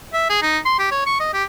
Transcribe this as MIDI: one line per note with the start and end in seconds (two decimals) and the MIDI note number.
0.13 0.25 76
0.30 0.42 68
0.42 0.58 63
0.65 0.76 84
0.79 0.87 67
0.92 1.06 73
1.06 1.18 85
1.20 1.30 75
1.34 1.44 67